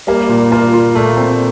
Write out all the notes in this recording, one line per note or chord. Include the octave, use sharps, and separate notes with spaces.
G3 A#3
A#2
A#3 F4
F4
A#2 A3
C4